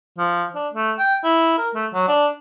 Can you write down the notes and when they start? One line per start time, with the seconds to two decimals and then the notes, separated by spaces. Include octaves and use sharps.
0.18 F3
0.55 D4
0.74 A3
0.99 G5
1.24 E4
1.58 A#4
1.75 A3
1.94 F#3
2.08 D4